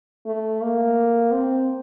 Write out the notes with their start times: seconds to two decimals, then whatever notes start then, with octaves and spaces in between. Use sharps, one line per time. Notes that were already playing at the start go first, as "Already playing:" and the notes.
0.26 A3
0.62 A#3
1.32 C4